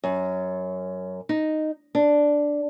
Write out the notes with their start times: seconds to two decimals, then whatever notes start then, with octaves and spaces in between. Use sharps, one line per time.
0.04 F#2
1.29 D#4
1.95 D4